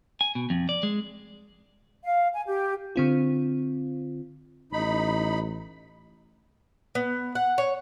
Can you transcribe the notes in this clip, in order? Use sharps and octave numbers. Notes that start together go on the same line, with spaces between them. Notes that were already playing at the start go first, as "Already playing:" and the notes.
G#5
B2
F2
D5
G#3
F5
G#5
G4
D3 C4 F4
A1 D#4 B5
B3
F#5
C#5